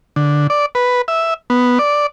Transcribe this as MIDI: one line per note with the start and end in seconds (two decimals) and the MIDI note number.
0.16 0.47 50
0.50 0.66 74
0.75 1.02 71
1.08 1.34 76
1.50 1.79 59
1.79 2.06 74